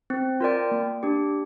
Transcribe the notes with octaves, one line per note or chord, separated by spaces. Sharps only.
C4
F4 A#4 D5 G5
A#3
D4 G4